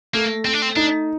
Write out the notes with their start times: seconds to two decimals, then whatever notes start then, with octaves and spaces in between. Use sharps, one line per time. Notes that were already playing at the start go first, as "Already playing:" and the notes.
0.14 A3 A#3
0.45 A3 C4
0.53 D4
0.62 C4
0.76 D4 D#4